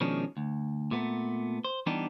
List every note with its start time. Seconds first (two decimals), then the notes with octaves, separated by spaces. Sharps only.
0.01 B2 D#3 F3 G#3 C#4 D4
0.37 D2
0.91 A#2 A3 B3
1.65 C5
1.86 E3 G3 B3 D4 D#4 G4